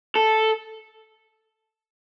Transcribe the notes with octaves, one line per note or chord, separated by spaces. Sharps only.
A4